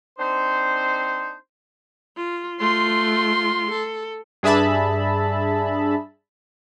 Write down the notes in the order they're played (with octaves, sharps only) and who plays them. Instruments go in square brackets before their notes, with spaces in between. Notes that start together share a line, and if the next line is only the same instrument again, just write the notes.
[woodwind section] C4 D4 D#4 C5
[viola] F4
[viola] A3 F4 [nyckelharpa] C6
[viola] A4
[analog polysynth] G2 D4 G#4 E5 A5 B5